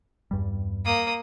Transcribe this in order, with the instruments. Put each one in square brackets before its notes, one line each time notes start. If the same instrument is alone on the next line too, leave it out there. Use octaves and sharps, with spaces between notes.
[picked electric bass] E2 G2 G3
[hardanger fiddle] A#3 D#6